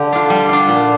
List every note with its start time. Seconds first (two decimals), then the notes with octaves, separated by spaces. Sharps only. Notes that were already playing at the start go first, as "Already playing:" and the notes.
Already playing: D3 G4
0.12 D4 F4
0.30 G3
0.49 D4 F4
0.68 A#2